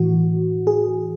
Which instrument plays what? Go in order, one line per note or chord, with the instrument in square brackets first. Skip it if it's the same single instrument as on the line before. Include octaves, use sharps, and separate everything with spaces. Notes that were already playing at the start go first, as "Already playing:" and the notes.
Already playing: [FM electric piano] A2 E3 F#4
G#4